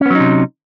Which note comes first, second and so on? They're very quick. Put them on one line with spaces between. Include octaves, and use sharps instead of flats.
C#4 B3 F#3 D#4 C3